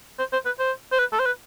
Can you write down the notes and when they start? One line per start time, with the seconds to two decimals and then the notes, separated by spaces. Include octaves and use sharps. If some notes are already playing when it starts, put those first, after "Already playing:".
0.19 C5
0.33 C5
0.46 B4
0.59 C5
0.92 C5
0.99 B4
1.13 A4
1.20 C5
1.26 B4